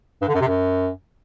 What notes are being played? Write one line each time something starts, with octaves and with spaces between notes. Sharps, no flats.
G2
D3
F#2
C3
F#2